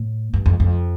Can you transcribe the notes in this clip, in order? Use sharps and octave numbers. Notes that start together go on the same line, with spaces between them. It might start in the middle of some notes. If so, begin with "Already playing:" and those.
Already playing: A2
G2
F2
F2